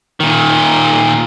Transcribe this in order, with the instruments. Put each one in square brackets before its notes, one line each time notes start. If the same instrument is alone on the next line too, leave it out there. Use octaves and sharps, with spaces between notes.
[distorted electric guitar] A#2 D#3